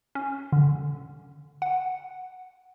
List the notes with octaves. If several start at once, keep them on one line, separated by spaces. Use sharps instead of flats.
C#4
D3
F#5